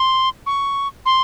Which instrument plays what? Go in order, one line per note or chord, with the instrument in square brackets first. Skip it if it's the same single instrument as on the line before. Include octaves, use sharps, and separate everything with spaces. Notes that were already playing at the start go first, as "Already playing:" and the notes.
Already playing: [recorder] C6
C#6
C6